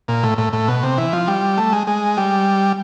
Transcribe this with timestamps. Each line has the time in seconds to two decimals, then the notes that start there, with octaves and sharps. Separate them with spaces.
0.08 A#2
0.23 A2
0.38 A2
0.53 A2
0.68 B2
0.83 C3
0.98 E3
1.13 F3
1.28 G3
1.58 A3
1.72 G#3
1.87 G#3
2.17 G3